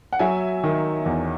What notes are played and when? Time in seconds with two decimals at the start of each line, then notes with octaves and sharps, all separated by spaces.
0.13 F#5
0.19 F#3 E5 G#5
0.63 D#3
1.06 E2